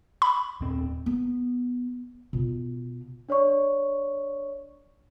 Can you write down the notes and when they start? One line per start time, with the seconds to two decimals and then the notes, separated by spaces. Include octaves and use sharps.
0.22 B5
0.61 D#1 C4
1.06 B3
2.33 B2 F4
3.29 D4 C#5 D5 C#6